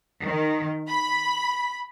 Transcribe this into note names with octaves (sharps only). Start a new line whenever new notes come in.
D#3
B5